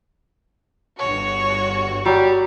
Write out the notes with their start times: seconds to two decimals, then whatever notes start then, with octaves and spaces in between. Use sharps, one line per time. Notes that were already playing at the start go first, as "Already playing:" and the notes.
0.99 G1 F#4 C#5
2.06 F#3 G3